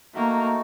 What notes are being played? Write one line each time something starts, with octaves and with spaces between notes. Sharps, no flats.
A3 A#3 D#4 F#4